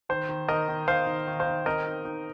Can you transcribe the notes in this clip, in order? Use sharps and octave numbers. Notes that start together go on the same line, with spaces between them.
D#3 C5
D#3
D#3 A#4 D#5
D#3
D#4 C5 F5
D#3
D#3
C5 F5
D#3
C4 A#4 D#5
D#4
D#4